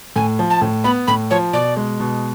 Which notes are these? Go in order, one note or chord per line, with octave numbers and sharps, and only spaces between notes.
A2 G#5
F3
A5
A2
B3 B5
A2 B5
F3 C#5
B2 D5
G#3
B2